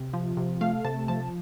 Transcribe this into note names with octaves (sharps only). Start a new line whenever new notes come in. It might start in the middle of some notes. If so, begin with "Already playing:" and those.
Already playing: C3
F3
C3
A3 F5
C3 A5
F3 A5